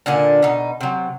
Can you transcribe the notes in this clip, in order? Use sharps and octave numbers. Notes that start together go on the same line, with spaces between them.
A#2 D3 D4 G#5
B2 D#4
C3 F#3